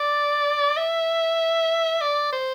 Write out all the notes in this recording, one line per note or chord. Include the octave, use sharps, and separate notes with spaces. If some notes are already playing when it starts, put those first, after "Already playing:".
Already playing: D5
E5
D5
C5